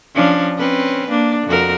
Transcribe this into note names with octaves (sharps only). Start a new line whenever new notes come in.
F3 C#4 D4
C4 C#4 B4
A#3 D4
F2 F#4 A#4